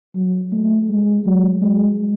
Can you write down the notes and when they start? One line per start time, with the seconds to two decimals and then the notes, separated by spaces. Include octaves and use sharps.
0.15 F#3
0.53 A3
0.89 G#3
1.26 F#3
1.62 G#3